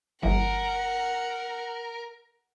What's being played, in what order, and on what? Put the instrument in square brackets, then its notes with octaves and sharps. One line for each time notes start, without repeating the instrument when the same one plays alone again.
[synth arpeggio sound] G1 E3 [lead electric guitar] A#4 [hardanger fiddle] F#5